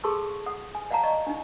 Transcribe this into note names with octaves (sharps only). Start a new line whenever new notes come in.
G#4 A4 A5 C6 C#6 E6
F#5 D#6
G#5
D5 F5 F#5 A5 A#5
D5 D#5 C#6
D4 D#4